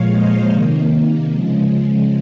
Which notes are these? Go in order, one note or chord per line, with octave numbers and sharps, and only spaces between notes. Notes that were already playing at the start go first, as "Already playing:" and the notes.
Already playing: A#2 F3 G#3 C#5 F5
C5 D#5
C3 D#3 A#3
C#3 F3 G#3